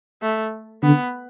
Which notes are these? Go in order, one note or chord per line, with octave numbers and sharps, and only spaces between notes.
A3
D3 B3